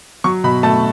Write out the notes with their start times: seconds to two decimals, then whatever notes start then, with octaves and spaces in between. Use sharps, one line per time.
0.24 F#3 C#6
0.44 B2 B5
0.63 A3 A5